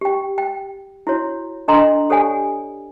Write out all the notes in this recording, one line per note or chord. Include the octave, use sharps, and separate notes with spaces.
G4 G5
G5
E4 F#4 C#5
D4 A4 D#5 A#5 C6
G4 A4 C#5 D5 F#5 G#5